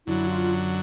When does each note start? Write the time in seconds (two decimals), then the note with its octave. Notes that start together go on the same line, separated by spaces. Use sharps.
0.06 F#2 D3 F#3 E4
0.28 F4